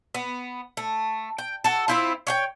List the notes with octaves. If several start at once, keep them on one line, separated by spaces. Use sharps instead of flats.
B3
A3
G5
F#4 A4
C4 E4 F4
C#5 F#5 G5